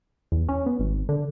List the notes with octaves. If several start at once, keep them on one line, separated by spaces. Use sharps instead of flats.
E2
C#4
B3
G#1
D3